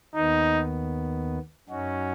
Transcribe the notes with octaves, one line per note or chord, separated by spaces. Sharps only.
D#2 D#3 B3 D#4
F#2 F#3 C#4 D#4 F#4